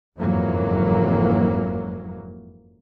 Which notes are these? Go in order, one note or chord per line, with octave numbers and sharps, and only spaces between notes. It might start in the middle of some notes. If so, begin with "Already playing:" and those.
F#1 F2 G#2 E3 F#3 A#3